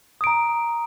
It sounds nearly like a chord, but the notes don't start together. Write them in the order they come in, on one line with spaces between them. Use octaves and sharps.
D#6 D7 A#5